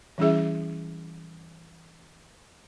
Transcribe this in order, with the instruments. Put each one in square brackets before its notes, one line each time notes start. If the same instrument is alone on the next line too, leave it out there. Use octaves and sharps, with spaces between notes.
[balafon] E3 G3 C#4 E4 G#4 E5